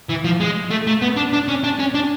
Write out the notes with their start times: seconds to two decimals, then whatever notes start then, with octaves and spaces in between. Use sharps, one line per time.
0.09 E3
0.25 F3
0.40 G#3
0.70 A3
0.87 A3
1.02 B3
1.17 D4
1.33 D4
1.48 C#4
1.64 D4
1.79 C#4
1.95 D4